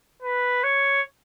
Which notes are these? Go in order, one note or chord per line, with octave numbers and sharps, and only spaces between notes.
B4
C#5